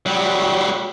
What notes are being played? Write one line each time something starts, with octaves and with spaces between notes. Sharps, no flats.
F#3 G3